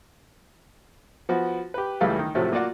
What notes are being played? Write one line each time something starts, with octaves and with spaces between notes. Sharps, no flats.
F3 B3 F#4
G4 B4
C#2 E3 G3 A3 G#4 F5
D#3
A2 C3 F3 F#3 A3
A#3 F4 F#4 D5 F#5